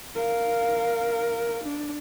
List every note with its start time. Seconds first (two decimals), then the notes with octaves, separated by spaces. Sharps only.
0.15 A#4 F5
1.64 D4